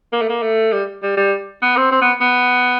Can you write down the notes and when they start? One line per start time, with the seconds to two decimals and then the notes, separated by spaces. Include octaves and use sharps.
0.13 A#3
0.21 A3
0.29 A#3
0.42 A3
0.73 G3
1.03 G3
1.17 G3
1.62 B3
1.77 C4
1.91 C4
2.01 B3
2.21 B3